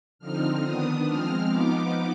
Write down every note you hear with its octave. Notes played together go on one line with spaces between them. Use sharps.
D3 F3 C4 D#4 F6
D#3 B3 D4 D#6
F3 G#3 C4 F6
F3 B3 D#4 D6